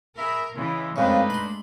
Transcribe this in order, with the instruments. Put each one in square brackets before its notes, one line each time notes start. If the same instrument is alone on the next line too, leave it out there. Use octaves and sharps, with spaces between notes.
[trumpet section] G#4 E5 B5 [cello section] A#4
[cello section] C#3 E3 [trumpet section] G#3 E4
[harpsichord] F2 C#3 [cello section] G#3 A3 D4 [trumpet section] D#4 B4
[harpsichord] B5 C6